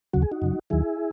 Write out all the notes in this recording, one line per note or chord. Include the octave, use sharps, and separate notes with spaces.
D#2 C#3 F#3 F#4
G#4
D#4 F#4
F#2 C#3 F#3
D#2 D#3 F#3 E4 G#4